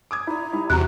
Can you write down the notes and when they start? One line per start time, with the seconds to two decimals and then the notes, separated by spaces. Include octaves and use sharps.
0.11 D6 D#6 G#6
0.27 E4 D5 A#5
0.53 G3 E4
0.70 E2 C3 F#4 A#5 F#6